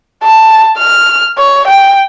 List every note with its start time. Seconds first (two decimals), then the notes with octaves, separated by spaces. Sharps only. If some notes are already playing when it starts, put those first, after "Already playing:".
0.24 A5
0.78 F6
1.38 C#5
1.68 G5